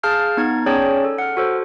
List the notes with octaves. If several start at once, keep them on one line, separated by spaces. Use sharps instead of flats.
G#4 F5 A5 F6 G6 C7
B3 D#4 G#6
C#4 G#4 C#5 D5 G5 A5
A4
F#5 F6
F#4 A4 C5